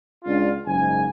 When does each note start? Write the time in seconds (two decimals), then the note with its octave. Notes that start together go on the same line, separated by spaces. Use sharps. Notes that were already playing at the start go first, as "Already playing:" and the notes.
0.25 C#2 D4 F4
0.66 F#1 G#2 G#5